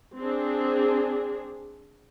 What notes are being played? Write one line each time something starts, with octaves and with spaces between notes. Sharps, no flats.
C4 D4 G#4